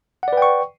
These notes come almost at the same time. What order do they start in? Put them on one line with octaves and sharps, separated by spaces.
F#5 D5 B4 G5 C#6